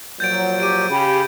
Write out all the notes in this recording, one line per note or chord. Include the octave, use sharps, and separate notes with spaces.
A#2 F3 F#3 G6 A6 D7
G4 D7 D#7
C#3 G4 B5